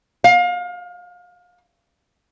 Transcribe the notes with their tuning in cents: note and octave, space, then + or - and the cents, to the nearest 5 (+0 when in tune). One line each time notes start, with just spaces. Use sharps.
F5 +30